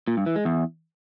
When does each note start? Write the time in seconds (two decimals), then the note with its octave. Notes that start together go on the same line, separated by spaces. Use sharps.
0.08 A#2
0.17 G2
0.26 E3
0.36 G#3
0.45 E2